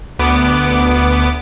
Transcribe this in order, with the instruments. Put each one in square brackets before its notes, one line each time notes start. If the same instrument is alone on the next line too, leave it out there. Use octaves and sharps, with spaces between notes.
[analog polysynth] D2 B3 D6